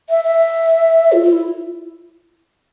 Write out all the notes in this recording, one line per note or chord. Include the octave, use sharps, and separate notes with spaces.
E5
E5
F4
F4
E4